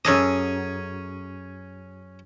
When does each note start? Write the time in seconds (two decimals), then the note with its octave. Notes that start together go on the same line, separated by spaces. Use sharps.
0.05 F#2 C#4 G#4 A4 D#5 D#6